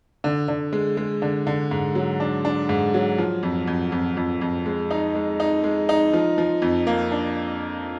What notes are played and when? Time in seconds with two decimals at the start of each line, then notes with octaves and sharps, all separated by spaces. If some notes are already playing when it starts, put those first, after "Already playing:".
0.24 D3
0.48 D3
0.73 G#3
0.97 G#3
1.22 D3
1.47 D3
1.71 G#2
1.95 F#3
2.20 D4
2.45 D4
2.69 G#2
2.94 F#3
3.18 F3
3.43 F2
3.67 F2
3.92 F2
4.17 F2
4.41 F2
4.66 G#3
4.91 D#4
5.15 G#3
5.40 D#4
5.64 G#3
5.89 D#4
6.13 F3
6.38 F3
6.62 F2
6.87 A#3
7.11 D4